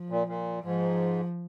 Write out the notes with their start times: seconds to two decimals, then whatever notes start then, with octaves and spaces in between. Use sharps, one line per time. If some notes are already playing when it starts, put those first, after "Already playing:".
Already playing: F3
0.09 A#2
0.27 A#2
0.62 G#2 F3